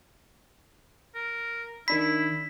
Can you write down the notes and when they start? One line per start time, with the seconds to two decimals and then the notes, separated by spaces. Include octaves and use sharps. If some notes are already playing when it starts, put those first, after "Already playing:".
1.15 A#4
1.88 D#3 D4 E4 B5 B6